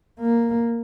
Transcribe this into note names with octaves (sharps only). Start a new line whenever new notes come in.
A#3